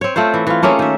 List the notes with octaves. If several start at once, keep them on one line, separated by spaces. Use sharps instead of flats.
C4 C#5
A3 C4 F4 C5
E3
E3 F4
A3 A#3 C#4 G#4
D#3 E5